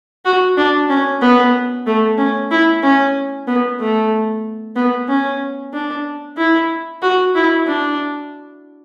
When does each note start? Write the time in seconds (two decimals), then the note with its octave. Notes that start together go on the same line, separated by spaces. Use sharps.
0.25 F#4
0.57 D4
0.89 C#4
1.22 B3
1.87 A3
2.18 C#4
2.51 E4
2.83 C#4
3.47 B3
3.80 A3
4.76 B3
5.09 C#4
5.73 D4
6.38 E4
7.02 F#4
7.35 E4
7.66 D4